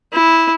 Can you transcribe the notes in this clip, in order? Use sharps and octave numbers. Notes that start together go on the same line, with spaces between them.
E4